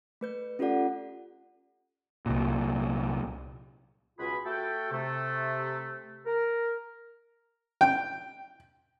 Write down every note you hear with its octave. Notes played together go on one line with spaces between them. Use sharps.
A3 B4 G6
C#4 F4 G4 A4 D5 F#5
C2 A#2
C#2 B2 F4 F#4 G#4 B5
A3 F#4 A4 G5
C3 A3
A#4
G5